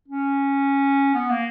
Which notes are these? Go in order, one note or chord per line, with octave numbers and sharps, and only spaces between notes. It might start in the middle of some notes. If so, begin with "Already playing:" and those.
C#4
B3
A#3